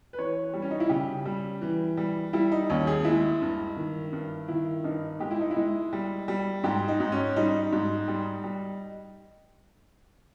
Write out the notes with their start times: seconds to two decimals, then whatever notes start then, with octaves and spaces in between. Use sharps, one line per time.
0.13 B4
0.19 E3 C#5
0.53 G3
0.62 C#4
0.71 D#4
0.80 E4
0.89 C#3 G4
1.25 G3
1.62 E3
1.97 G3
2.33 G3 E4
2.52 D#4
2.69 D#2 C#4
2.87 G#4
3.04 G#3 E4
3.41 G2
3.77 D#3
4.13 G2
4.48 D#3 E4
4.84 G2 D#4
5.20 G#3 G4
5.31 E4
5.41 D#4
5.51 E4
5.56 G#3
5.93 G3
6.28 G3
6.64 G#2 G4
6.88 D#4
7.00 G#2
7.12 C#4
7.36 G3 D#4
7.72 G#2
8.08 G3
8.44 G3